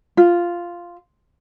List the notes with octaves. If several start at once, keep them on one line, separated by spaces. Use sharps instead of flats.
F4